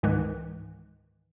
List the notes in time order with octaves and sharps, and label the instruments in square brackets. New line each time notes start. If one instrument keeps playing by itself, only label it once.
[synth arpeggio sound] C#2 G#2 D#3 E3 G#3 F#6